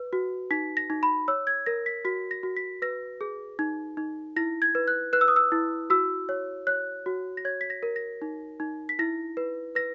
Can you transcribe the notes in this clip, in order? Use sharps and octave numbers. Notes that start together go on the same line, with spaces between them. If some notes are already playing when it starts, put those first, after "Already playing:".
Already playing: B4
F#4
D#4 B6
A#6
D#4
B5
C#5 E6
G#6
A#4 A#6
B6
F#4 B6
A#6
F#4
B6
B4 A#6
G#4
D#4
D#4
E4 A#6
G#6
B4
F#6
B4 F#6
E6
D#6
E6
E4
F#4 E6
C#5
C#5 F#6
F#4
A#6
C#5 G#6
B6
A#6
A#4
A#6
D#4
D#4
B6
E4 A#6
B4
B4 A#6